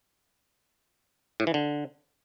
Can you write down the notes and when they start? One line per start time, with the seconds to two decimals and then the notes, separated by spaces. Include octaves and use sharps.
1.40 A2
1.47 E3
1.54 D3